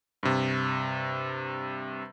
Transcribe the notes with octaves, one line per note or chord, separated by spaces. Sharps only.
G2 C3